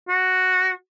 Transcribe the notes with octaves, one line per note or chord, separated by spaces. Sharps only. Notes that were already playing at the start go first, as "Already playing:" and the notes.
F#4